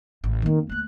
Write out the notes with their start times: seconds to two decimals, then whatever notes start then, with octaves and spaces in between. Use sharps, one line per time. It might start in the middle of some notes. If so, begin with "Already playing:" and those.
0.24 A1 C#3
0.42 F2 D#3 A#3
0.69 D2 A#3 F#6